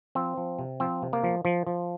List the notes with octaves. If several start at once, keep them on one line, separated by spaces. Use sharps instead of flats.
F3 C4
F3
C3
F3 C4
C3
A#3
F3
F3
F3